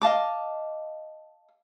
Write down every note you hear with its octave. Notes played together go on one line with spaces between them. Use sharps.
D#5 F5 A5 D6